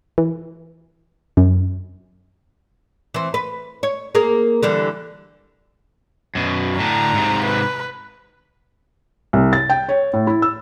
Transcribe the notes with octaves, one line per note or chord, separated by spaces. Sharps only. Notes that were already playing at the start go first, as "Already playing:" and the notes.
E3
F#2
E3 C4
B4
C#5
A#3 G#4 A#4
D3 E3 G3
F#2 B2
A2 D3 A#5
G#2 C3
B4
C2
A6
G5
C#5
A2
E4
E6